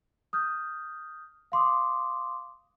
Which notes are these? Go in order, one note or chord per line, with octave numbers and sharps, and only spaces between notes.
D#6 F6 G6
F5 C6 D6 D#6